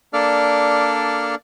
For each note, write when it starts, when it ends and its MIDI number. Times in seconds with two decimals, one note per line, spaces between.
0.13 1.35 58
0.13 1.35 62
0.13 1.35 69
0.13 1.35 74
0.13 1.35 89